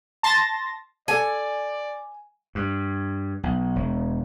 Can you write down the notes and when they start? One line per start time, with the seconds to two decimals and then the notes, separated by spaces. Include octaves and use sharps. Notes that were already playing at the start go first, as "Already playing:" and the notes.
0.23 A5 C6 A6 A#6
1.08 A4 D5 G#5 A5
2.55 G2
3.43 B1
3.76 E1